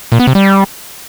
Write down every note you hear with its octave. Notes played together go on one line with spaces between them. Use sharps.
A#2
B3
C3
G3